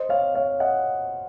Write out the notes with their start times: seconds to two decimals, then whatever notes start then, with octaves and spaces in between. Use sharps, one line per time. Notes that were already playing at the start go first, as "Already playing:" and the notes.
Already playing: C5 D#5
0.09 C#5 F5
0.35 C#5 F5
0.60 D#5 F#5